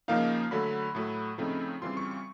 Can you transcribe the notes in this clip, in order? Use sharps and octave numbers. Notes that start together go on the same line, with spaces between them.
C#3 F3 A#3 D#4 F5
D3 F#3 A3 B5
A2 F#3 A3
C#3 F3 A3 C4 D#4
C#3 E3 G3 C4 F4 C6
C#6
C#6